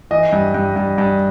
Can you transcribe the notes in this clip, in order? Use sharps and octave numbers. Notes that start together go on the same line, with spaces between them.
E3 D#5
G2
G2
G2
G2